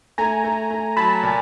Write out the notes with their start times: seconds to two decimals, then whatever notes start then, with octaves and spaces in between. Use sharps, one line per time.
0.18 A3 G#5 A#5
0.44 A3
0.70 A3
0.97 F#3 A5 B5
1.23 A#2